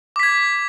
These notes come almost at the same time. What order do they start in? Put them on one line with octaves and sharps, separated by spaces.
D6 B6 G#6